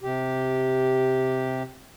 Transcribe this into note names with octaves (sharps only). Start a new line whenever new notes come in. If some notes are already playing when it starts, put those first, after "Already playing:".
C3 G4